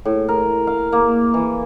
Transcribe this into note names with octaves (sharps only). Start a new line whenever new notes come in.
A2
A#4
F5
A#3
E3